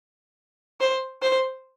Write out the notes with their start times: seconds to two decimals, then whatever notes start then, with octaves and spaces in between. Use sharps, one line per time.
0.80 C5
1.22 C5